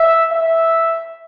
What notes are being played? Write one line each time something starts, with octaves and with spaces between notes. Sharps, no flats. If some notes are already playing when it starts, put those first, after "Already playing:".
Already playing: E5
E5